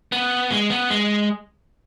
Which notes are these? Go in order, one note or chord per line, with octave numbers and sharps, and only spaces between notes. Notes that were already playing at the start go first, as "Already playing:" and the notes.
B3
G#3
B3
G#3